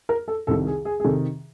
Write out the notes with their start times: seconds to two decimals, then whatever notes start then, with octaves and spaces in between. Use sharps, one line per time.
0.09 A#4
0.28 A4
0.47 C2 C3 D#3 A4
0.67 G#4
0.85 G#4
1.00 G#4
1.04 C3 D#3 A4